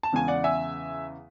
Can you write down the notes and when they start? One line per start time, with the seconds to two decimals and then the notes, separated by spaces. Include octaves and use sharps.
0.03 A5
0.13 E2 C#3 G#3 G#5
0.28 D5 F#5
0.44 E5 G#5